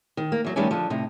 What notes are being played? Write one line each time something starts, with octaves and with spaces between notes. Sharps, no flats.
D#3
A#3
E2 F#3
D#3 G3 A3 C#4
D3 F3
A2 C3 D#4